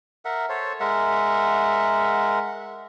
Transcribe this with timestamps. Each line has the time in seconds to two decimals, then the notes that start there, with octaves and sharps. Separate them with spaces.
0.25 A#4 E5 F#5
0.49 A4 C5 C#5
0.80 G#3 A#4 E5 F#5